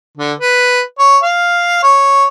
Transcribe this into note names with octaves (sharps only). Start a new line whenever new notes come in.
D3
B4
C#5
F5
C#5